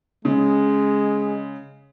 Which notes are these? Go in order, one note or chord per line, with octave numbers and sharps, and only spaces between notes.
C#3 G#3